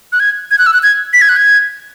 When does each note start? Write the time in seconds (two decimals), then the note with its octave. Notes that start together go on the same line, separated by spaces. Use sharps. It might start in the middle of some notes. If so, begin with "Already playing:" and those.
0.13 F#6
0.20 G#6
0.51 G#6
0.58 F#6
0.67 E6
0.73 F#6
0.83 G#6
1.13 B6
1.22 G#6
1.29 F#6
1.36 G#6